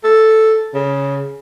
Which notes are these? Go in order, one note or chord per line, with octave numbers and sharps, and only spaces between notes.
A4
C#3